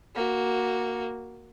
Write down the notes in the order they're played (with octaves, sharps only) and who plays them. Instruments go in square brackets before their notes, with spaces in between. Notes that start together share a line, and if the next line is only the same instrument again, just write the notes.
[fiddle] A#3 F#4